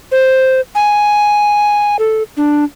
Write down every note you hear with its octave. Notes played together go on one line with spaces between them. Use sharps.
C5
G#5
A4
D4